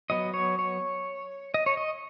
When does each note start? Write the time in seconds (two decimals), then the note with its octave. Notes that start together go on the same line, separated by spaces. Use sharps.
0.10 F#3 B3 D#5
0.34 C#5
0.59 C#5
1.54 D#5
1.66 C#5
1.77 D#5